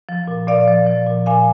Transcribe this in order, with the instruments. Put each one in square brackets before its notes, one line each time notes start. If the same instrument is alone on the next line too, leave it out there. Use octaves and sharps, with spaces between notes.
[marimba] F3
A#2
A#2 D5 F5
F3
F3
A#2
A#2 F5 G#5